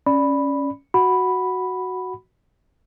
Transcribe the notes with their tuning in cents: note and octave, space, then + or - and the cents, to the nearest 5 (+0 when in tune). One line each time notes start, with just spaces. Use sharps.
C#4 +0 D5 +0 B5 +0
F#4 +0 F#5 +0 B5 +0